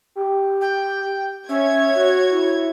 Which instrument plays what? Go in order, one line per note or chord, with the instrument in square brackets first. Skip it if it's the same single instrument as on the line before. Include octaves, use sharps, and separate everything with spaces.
[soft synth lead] G4
[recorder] G5
[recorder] C#4 [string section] C#5 G#6 [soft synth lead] E5
[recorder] F#4
[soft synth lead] E4